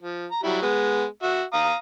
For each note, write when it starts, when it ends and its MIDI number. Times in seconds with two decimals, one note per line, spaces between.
0.01 0.26 53
0.31 0.40 82
0.43 0.61 54
0.43 0.61 55
0.43 0.61 64
0.62 1.04 56
0.62 1.04 59
1.23 1.42 66
1.23 1.42 76
1.53 1.75 77
1.53 1.75 82
1.53 1.75 87